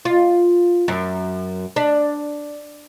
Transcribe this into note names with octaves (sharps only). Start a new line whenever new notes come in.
F4
F#2
D4